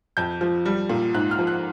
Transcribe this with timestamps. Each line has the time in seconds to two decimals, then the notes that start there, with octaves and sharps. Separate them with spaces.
0.17 F2 G6
0.41 F3
0.65 G3
0.89 A#2
1.14 G#2 F#6
1.31 F6
1.39 F3
1.47 F#6